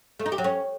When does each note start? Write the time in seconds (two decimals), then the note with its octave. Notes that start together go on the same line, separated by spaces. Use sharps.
0.19 A3
0.26 D#4
0.32 G4
0.38 F#3
0.44 C#4